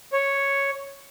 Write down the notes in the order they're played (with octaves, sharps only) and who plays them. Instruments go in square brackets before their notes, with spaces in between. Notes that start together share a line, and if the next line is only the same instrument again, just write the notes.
[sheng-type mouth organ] C#5